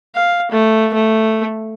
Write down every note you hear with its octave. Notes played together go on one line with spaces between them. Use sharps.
F5
A3
A3